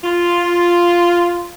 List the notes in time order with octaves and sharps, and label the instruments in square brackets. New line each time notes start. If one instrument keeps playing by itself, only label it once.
[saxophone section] F4